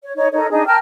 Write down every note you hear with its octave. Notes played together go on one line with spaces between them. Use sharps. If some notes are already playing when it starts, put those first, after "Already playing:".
C#5
D#4 C#5
D#4 A4 A#4 C#5
D4 D#4 G#4
A#4 G5 A5 F6